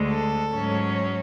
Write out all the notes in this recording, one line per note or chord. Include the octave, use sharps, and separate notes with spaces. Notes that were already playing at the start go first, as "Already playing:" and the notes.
Already playing: D2 D3 G#3
A4
G#2 F#3 C#4